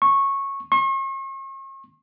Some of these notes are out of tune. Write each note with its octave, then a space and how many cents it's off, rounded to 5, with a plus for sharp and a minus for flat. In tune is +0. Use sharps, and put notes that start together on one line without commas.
C#6 -15
C#6 -45